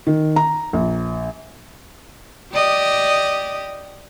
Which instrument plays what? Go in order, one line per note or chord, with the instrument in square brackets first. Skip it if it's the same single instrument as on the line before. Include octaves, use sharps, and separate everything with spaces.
[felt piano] D#3
A#5
A#1
[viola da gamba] G4 D5 D#5